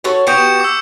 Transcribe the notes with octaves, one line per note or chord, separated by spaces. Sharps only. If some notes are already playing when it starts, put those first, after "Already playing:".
F#4 A4 C#5
B3 F#4 G4 C#6 G6 C#7
E7
D6 E6